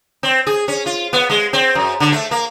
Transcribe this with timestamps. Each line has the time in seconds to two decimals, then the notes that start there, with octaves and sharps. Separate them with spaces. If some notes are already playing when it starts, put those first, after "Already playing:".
0.23 C4
0.47 G#4
0.68 C#4
0.86 F4
1.13 B3
1.30 G#3
1.53 C4
1.75 F#2
2.00 D3
2.12 A3
2.31 A#3